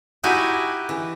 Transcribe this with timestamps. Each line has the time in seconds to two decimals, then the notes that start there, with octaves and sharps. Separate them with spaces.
0.24 D#4 E4 F#4 G4 G#5
0.89 E3